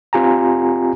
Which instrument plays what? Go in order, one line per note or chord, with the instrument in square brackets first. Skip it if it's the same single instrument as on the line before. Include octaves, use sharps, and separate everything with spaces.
[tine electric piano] C4 F4 G4 G#5 A#5